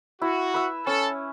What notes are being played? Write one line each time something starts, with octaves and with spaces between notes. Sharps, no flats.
E4 F#4
B4 E5
C#4 A4